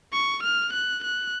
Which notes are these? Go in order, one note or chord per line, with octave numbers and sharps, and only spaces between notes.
C#6
F6
F#6
F#6